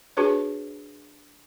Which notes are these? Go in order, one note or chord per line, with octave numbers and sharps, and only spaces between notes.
D4 F#4 G#4 B4 C#5